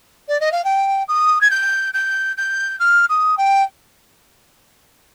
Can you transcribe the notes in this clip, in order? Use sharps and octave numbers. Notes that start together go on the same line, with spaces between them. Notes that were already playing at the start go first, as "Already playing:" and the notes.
D5
D#5
F5
G5
D#6
G#6
G6
G6
G6
F6
D#6
G5